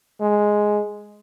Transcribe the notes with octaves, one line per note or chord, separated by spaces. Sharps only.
G#3